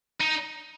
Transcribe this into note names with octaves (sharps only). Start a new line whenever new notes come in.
D#4